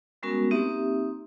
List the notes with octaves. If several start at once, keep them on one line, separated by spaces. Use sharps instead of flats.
G3 G#3 B3 C#4 F#4 A#4
A#3 C4 D#4 G4 E5